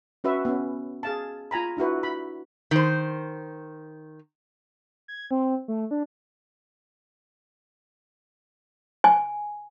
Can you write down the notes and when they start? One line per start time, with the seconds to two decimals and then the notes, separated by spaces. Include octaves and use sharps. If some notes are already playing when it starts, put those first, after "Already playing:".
0.24 C#4 F#4 B4 E5
0.45 B3 C#4
1.03 G#4 F5 A5
1.51 F4 G#5 A#5 B5
1.77 D4 E4 F#4 B4
2.03 B5
2.71 D#3 C5
5.08 G#6
5.31 C4
5.68 A3
5.91 D4
9.04 G#5